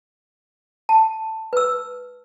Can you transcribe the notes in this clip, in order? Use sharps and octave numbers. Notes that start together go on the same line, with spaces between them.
A5
B4 E6